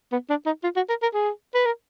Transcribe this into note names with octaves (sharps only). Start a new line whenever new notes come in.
B3
D4
D#4
F4
F#4
A#4
A#4
G#4
B4
A#4